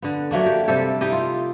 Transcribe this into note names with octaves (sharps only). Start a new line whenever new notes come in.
D3 B3
F#3 A3 A#3 D4
G4
C3 G3 G4 A4
D#4 E4 G4 D#5
F4